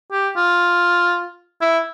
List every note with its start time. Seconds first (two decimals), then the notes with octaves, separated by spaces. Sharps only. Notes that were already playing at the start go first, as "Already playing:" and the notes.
0.12 G4
0.36 F4
1.61 E4